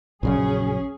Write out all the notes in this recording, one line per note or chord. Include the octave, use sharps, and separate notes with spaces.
A#1 F#2 C#3 C#4 G#4